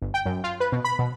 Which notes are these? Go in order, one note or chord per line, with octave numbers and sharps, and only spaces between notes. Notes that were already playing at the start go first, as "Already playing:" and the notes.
G1
G5
F#2
F4
B4
B2
B5
B2